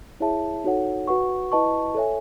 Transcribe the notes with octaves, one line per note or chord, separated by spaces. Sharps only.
E4 G#4 C#5 E5 A5
D#4 F#4 A4 C#5 F#5
F#4 B4 F#5 C#6
E4 B4 D#5 A5 C#6
A4 C#5 E5 G#5